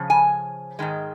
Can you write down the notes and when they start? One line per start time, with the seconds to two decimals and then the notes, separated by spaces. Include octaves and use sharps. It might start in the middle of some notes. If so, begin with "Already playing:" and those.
Already playing: C#3 F3
0.10 G#5
0.79 G#2 D#3 G#3